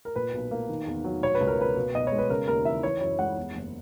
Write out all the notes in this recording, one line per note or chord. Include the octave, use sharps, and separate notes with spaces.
A#4
A#2 B4
B1
A#3
D#3
E2
F#3
B2 C#5
B4
C#2
A#4
A#3 B4
B2
B1 D#5
G#3 C#5
B4
C#3 A#4
D#2 A#4
E3 E5
E3 C#5
F#2 C#5
G#3 F#5
E2
F#1